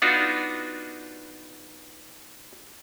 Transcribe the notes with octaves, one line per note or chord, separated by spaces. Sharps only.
B3 D4 D#4 F4 F#4